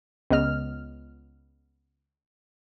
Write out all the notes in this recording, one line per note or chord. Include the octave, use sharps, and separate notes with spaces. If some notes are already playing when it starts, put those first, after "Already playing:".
C#2 B3 D#5 F6